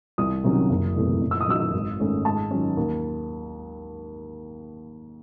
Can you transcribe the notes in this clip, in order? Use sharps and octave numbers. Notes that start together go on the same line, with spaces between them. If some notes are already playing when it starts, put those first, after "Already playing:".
C2 D#6
C3 D#3 F#3 C#4
F#1
E2 C3 E3 A3
F#1
E6
D#6
F#2 D#3 E6
G#1
G#2 D#3 A3 C#4
G#2 A5
D#3 F#3 C#4
D#2